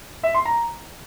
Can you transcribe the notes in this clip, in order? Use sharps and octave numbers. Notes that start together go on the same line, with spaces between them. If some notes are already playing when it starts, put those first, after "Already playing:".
E5
C6
A#5